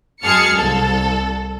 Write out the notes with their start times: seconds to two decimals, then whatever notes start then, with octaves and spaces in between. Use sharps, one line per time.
0.24 F#2 G#3 G#4 A5 F6 C#7
0.56 C2 A4